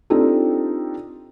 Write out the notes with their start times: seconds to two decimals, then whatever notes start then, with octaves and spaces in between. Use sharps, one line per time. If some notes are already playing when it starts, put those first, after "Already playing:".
0.10 C4 D4 D#4 F4 G4 A4